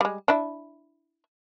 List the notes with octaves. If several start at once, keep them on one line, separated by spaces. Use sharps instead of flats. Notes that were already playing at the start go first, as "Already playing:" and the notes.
G3 G#3
D4 E4